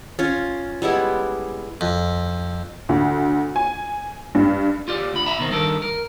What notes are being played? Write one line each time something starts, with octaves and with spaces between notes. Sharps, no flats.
C#4 F4
G3 G#3 B3 E4
F2
D2
G#5
G2
F4 G4 D5
D2 B5
E5 A#5 B5
B2 D#3 C4
G2 D#3 A4 A#4
A#4